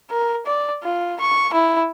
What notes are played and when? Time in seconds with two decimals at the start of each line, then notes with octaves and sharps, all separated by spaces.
0.10 A#4
0.46 D5
0.83 F4
1.20 C#6
1.53 E4